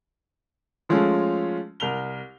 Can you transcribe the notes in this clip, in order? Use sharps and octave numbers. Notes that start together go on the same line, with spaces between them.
F3 G#3 A3 C#4 F4
C2 A#4 F7 G7